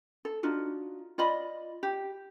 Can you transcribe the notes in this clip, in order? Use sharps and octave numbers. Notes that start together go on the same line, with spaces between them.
A4
D4 D#4 F4 F#4
F4 D5 D#5 B5
G4